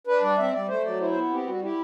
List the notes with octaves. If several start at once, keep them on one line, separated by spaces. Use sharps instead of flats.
D4 B4
G3 D5
C4 E5
G3 D5
A3 C5
F#3 D5
E4 C5
C5
B3
C4 G4
G3 F#4
E4 G4